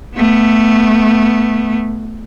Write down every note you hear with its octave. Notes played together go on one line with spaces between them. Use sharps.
A3 B3